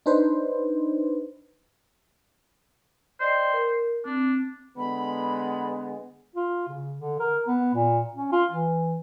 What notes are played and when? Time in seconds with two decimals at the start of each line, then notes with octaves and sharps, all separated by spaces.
0.06 D4 D#4 B4 C5
3.20 C5 D5 D#5 G5
3.53 A#4
4.05 C4 D4
4.77 D3 G#3 B3 B5
6.36 F4
6.68 C#3
6.97 D3
7.20 A#4
7.47 B3
7.74 A#2
8.15 C#4
8.32 F4
8.51 E3